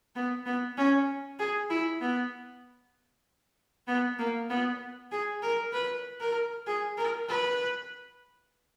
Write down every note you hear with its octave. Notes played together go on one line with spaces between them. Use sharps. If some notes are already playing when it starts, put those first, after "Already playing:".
B3
B3
C#4
G#4
E4
B3
B3
A#3
B3
G#4
A#4
B4
A#4
G#4
A#4
B4